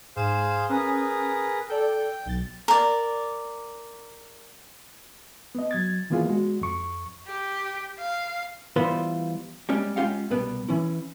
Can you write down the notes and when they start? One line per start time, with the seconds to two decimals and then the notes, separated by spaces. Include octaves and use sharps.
0.16 G#2 G#4 C5 F5 E7
0.69 C#4 G#4 A#4 B4 D#6
1.69 A4 D5 G5
2.26 B1 A6
2.68 A#4 D5
5.55 B3 D#5
5.71 F#3 G#6 A6
6.10 D#3 E3 A#3 B3 F4 G#4
6.27 G#3 F#4
6.61 F2 C#6
7.27 G4
7.99 F5
8.76 E3 G3 B3 F4 B4 C5
9.69 G3 G#3 C#4 G4
9.96 G#3 C#4 F4 G4 F5 F#5
10.31 C2 B2 G3 B3 B4
10.69 E3 C#4 E4